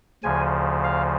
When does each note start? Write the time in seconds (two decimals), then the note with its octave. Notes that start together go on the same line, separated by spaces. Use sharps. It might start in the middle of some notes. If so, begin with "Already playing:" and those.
0.23 D2 C#3 F3 G#5
0.84 F5